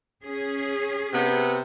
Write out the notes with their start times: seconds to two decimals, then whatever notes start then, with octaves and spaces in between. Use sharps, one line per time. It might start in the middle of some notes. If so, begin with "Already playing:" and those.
0.24 C#4 G#4
1.13 C3 B3